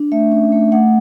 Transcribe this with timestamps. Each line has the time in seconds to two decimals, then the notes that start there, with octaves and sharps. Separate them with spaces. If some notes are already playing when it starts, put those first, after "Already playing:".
Already playing: D4
0.12 A3 E5
0.32 C#4
0.52 A3
0.72 A3 F#5